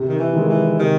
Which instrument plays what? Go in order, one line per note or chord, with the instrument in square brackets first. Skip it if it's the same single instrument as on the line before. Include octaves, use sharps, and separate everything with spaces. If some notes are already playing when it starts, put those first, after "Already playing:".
Already playing: [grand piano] C3
[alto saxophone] D#3
E3
[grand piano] D#3 G#3
[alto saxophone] E3
[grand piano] C3 [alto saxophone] D#3